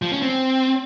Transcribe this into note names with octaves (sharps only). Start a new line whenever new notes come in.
F3
C#4
C4